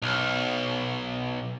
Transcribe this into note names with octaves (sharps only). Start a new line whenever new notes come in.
B1